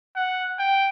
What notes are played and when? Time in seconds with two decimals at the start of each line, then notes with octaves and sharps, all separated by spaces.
0.16 F#5
0.59 G5